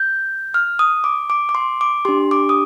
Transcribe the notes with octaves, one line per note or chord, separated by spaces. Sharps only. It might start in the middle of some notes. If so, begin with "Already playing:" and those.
Already playing: G6
F6
D#6
D6
D6
D6
C6
D6
D4 G4 C6
D6
D#6